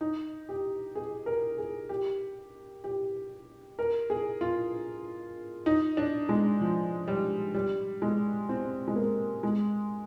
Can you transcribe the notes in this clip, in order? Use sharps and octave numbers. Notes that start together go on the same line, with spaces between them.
D#4
G4
G#4
A#4
G#4
G4
G4
A#4
G#4
F4
D#4
D4
G#3
F3
G3
G3
G#3
C4
G#3
A#3
G#3